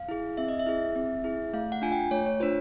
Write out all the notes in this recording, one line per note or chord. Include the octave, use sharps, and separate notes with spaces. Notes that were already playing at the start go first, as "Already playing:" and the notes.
Already playing: F5
E4 G#4
C4 E5
D#5
E5
E4 G#4
C4
E4 G#4
A3 F5
F#5
D4 F4 G#5
G5
A3 C#5
C#5
D4 F4 C5